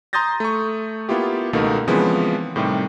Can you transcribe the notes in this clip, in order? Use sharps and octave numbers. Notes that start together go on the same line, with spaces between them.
A#5 C6 D#6 G6 A6 A#6
A3 C#6
A#3 B3 E4 F4 G4
C#2 B2 D#3 A3 A#3
C#3 E3 F3 G#3 B3 C4
A2 C3 D#3 G3